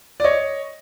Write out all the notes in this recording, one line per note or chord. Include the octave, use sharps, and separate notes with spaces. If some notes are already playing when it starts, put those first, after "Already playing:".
D5
C#5 D#5